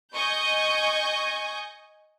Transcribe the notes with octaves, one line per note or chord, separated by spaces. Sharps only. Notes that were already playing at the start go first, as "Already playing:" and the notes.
D#5 G#5 C#6 G6